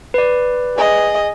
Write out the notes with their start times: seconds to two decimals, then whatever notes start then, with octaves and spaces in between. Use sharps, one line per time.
0.14 B4 D5
0.77 G#4 D#5